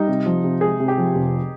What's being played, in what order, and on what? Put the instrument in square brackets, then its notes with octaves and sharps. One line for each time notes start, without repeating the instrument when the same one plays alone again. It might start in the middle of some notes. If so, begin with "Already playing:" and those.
Already playing: [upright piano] G3 [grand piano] D#4
[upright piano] C3
F3
C3
[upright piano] G#3 [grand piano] G#4
[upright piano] C3
[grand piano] G4
[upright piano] F3
F1